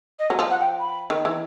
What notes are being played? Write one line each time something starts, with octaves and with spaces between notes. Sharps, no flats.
D#5
F#3
F3
F#5
G5
B5
D#3
E3